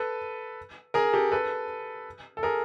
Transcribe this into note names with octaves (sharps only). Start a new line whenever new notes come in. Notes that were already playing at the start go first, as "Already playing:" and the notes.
Already playing: A4 B4
G#4 A#4
G4 A4
A4 B4
A4
G#4 A#4